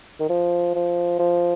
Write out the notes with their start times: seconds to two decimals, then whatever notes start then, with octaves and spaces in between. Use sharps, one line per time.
0.20 D#3
0.29 F3
0.75 F3
1.19 F3